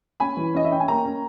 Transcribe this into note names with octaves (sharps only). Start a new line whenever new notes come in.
C#4 G#5 B5
E3
C#4 D#5
E5
C#4 G5
G#5
A#3 G5 A#5
C#4